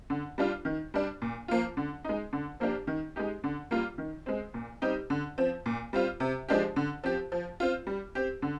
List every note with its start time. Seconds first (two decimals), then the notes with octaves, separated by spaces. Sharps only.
0.10 D3
0.38 G3 D4 F4
0.65 D#3
0.94 G3 D4
1.22 A#2
1.48 F3 A#3 F4
1.77 D3
2.04 G#3 D#4
2.33 D3
2.60 F3 A#3 D4 G4
2.87 D#3
3.16 G#3 D#4 G4
3.44 D3
3.71 G3 A#3 F4
3.98 D#3
4.26 G#3 C4
4.54 A#2
4.82 G3 C4 D#4 G4
5.10 D3
5.38 F3 C4
5.66 A#2
5.93 G3 C4 F4
6.20 C3
6.49 F3 G#3 D4 G4
6.76 D3
7.04 F3 C4 G4
7.32 F3
7.60 C4 F4
7.87 G3
8.15 C4 G4
8.42 D3